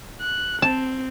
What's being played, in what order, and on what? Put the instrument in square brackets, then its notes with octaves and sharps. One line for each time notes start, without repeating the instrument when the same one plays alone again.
[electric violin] F#6
[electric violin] C4 [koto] A5